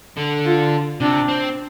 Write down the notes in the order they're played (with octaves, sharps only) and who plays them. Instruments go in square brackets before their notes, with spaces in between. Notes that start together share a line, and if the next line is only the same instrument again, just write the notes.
[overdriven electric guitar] D3
[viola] F4
[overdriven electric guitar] C3 [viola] D4
[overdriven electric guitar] C4